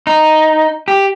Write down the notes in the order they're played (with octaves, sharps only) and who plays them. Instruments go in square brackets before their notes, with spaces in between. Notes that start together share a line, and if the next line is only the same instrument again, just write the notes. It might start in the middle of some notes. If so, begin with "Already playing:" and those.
[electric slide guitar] D#4
G4